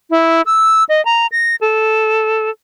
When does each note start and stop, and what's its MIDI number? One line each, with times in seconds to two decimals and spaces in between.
0.10 0.41 64
0.46 0.84 88
0.89 1.03 75
1.05 1.26 82
1.32 1.55 94
1.61 2.50 69